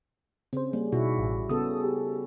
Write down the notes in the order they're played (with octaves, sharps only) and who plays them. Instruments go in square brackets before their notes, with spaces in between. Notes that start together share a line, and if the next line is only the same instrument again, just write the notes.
[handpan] C#3 [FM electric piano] C4 C5
[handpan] G3 [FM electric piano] A#3
[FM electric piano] B2 D#4 [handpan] E4 F#4
[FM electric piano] A1
[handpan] C#3 B3 A4 [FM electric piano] D#6
[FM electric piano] G4